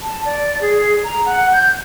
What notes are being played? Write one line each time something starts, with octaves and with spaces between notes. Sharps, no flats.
A5
D5
G#4
A#5
F#5
G6